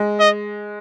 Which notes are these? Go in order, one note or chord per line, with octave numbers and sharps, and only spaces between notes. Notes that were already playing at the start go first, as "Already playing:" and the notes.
Already playing: G#3
D#5